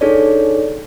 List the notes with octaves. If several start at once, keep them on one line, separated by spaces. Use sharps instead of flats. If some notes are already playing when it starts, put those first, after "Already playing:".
D4 D#4 G#4 A4 C#5 D5